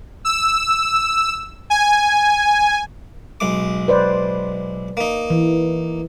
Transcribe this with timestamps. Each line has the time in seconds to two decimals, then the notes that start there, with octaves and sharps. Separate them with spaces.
0.25 E6
1.70 G#5
3.40 B1 G#3 D6
3.88 B4 C5 D5
4.97 A#3 D#4
5.30 E3